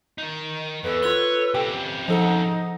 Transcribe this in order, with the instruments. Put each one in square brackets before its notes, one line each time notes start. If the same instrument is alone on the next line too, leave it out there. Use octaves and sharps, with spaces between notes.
[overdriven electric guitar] D#3 D#4
[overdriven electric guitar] E2 [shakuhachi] A4 [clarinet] B4
[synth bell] F4 F#6 G7 [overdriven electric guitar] C#5
[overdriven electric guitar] C#3 C4 [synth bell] G4 G5
[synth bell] F3 A4 F#5 [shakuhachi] D#4 [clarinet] D#5